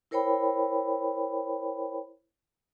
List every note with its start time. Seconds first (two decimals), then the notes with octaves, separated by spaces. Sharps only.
0.11 E4 A#4 C5 C#5 G5 B5